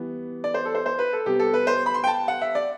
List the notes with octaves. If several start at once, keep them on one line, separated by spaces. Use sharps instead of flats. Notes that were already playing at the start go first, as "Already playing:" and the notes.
Already playing: E3 G3 B3
D5
C5
A4
C5
C5
B4
A4
C3 G3 B3 G4
A4
B4
C5
B5
C6
G5
A5
F#5
E5
D5